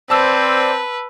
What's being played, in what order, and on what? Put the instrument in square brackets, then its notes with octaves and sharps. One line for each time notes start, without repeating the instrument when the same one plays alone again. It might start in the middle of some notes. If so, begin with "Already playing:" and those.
[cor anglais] C4 [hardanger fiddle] B4 [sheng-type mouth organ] C5 D5 [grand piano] A5 E6